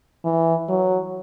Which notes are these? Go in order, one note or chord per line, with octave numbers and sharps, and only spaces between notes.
E3
F#3